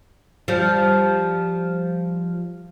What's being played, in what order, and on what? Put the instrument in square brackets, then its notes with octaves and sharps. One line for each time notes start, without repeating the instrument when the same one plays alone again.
[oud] F3 G3